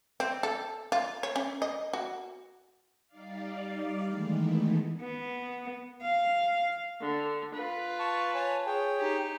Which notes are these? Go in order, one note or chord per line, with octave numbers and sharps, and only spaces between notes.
C4
A4
F4
C#5
C#4
D#5
F#4
G3 D#4 D5 F5
D#3 E3 G#3 A3 B3
B3
F5
D3
F4 B4
A5 C#6
C#5 G#5 A5
G#4 C#5 G5
D#4 G4